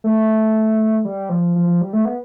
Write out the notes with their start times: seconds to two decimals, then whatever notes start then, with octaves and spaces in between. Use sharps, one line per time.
0.04 A3
1.05 G3
1.29 F3
1.56 F3
1.67 F3
1.81 G3
1.93 A3
2.05 B3